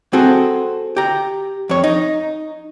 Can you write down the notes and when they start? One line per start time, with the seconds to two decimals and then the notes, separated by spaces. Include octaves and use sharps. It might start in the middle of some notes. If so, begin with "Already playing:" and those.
0.13 C4 F#4 G#4 A4
0.97 G4 A#5
1.69 F2 C#5
1.84 D#4